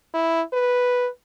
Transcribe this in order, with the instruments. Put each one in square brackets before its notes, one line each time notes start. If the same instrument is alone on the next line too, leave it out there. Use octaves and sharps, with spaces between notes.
[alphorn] E4
B4